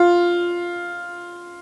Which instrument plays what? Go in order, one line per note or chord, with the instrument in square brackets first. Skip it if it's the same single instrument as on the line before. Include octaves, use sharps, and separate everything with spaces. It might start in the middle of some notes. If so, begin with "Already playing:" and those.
Already playing: [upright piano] F4